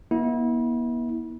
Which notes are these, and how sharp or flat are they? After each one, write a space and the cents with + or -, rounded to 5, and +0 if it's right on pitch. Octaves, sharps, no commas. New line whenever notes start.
B3 -45 E4 -35